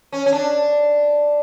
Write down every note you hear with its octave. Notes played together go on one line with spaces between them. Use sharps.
C#4
C#4
D4